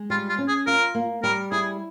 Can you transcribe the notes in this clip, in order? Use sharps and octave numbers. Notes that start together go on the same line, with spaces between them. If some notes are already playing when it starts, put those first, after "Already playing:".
Already playing: G#3
G3 F4
F4
C#4
G#4
F4 A#4
A#3
G3 A#4
E4 G#4